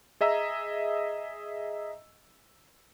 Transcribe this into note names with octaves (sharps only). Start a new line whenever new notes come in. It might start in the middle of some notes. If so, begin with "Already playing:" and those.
G#4 D#5 E5 A#5 E6